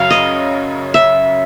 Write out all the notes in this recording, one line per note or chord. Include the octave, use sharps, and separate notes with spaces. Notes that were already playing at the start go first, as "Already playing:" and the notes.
Already playing: F#2 C#3 F#3 F5
D#5
E5